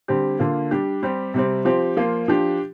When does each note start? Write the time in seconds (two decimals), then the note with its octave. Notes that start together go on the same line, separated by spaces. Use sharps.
0.08 D3 G3 C4 G4
0.40 D3 A#3 F4
0.71 G3 D4 G4
1.03 G3 C4 G4
1.34 C3 G3 C4
1.65 F3 C4 G4
1.97 F3 A#3 F4
2.28 F3 D4 G4